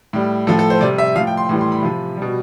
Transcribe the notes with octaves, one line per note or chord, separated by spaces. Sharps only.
A2 G3
A2 F3 A4
A4
C5
C3 G3 D5
E5
A2 F3 F5
G5
C6
A2 E3 G3
C6
B5
C3 F3
B2 G3